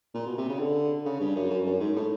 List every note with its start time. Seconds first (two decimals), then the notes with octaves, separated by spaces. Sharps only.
0.14 A#2
0.26 B2
0.37 C3
0.49 C#3
0.59 D3
1.05 C#3
1.20 G2
1.36 F#2
1.50 F#2
1.66 F#2
1.80 G#2
1.96 A2